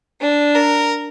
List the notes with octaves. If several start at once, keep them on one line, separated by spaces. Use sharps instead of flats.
D4
A#4